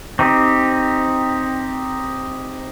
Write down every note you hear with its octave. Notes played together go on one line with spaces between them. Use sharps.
C4 D#4 G4